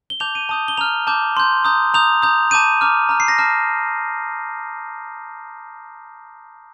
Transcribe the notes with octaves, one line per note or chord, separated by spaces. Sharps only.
G7
A5 D6 G6 F7
D#7
A5 D#6 G6
G7
A#5 F6 F7
A5 D6 G6
C6 G6
A#5 D#6 G6
A#5 D#6 G6 F7
A#5 D#6 G6
A5 D6 G6 D#7
A#5 D6 F6
A#5 F6
C7
A#6
A5 D6 F6